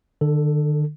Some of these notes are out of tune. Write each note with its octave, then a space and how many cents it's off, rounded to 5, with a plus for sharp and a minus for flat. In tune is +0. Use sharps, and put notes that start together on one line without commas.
D3 +40 A4 +0